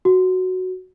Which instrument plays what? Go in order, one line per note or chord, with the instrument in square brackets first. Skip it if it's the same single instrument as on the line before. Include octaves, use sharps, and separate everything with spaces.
[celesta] F#4